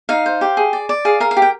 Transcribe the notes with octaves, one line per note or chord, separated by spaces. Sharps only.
D#4 F5
C5
G4
G#4
D5
D5
G#4 F5
A#4 F5
F5
G4
G5